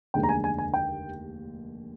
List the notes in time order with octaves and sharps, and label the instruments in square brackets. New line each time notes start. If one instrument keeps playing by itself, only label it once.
[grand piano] F1 D#2 D3 G#3 G5
A#5
G#5
G#5
G#5
G5